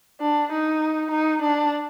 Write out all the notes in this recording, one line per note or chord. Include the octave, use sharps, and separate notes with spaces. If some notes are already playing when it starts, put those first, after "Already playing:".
D4
D#4
D#4
D4